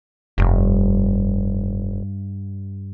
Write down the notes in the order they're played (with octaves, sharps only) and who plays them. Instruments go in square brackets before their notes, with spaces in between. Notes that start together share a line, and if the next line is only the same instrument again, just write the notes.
[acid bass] F1 [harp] G2